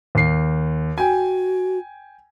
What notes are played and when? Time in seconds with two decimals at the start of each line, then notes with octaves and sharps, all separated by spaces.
0.15 D#2 C7
0.98 F#4 G5 G#5